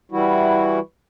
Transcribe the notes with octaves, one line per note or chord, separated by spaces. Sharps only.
E3 G3 E4 F#4